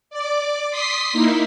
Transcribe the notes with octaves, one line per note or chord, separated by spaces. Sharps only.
D5 D6
C6 D#6 B6 C7
A#3 D#4 E4